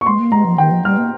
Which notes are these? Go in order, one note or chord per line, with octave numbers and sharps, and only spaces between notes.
C#6
G#3 C6
A#3
G#3 A#5
F3
D#3 G5
F3
G3 F6
A#3